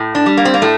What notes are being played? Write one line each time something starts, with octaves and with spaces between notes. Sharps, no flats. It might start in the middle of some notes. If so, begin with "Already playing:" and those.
Already playing: A2
D4
G3
A#3
C4
A#3
A2 A3